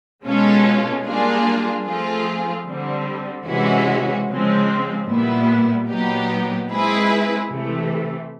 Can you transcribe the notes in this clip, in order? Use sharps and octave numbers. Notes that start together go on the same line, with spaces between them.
B2 G#3 C#4 F4 A4
G3 A#3 D4 F4 G#4
F3 A3 C4 F4 G#4
D3 G3 C4
C3 E3 G#3 C#4 F#4
C#3 F3 G#3 C4
A#2 G3 B3 E4
A#2 F#3 B3 D#4 G4
G#3 C4 E4 G#4 B4
C3 E3 A3